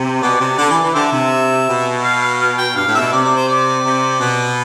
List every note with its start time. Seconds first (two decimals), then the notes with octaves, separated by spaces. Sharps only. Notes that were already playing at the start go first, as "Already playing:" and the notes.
Already playing: C3
0.22 B2 D5
0.40 C3
0.58 D3
0.70 E3
0.83 E3
0.95 D3 G4 C5 E5
1.12 C3
1.68 B2
2.04 F5
2.22 F5
2.40 F5
2.58 G5
2.76 G2 F5
2.88 A2
2.94 C3 E5
3.00 B2
3.13 C3 D5
3.24 D5
3.36 C5
3.48 D5
3.85 C3
4.20 B2